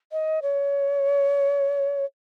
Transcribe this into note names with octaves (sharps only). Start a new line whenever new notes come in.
D#5
C#5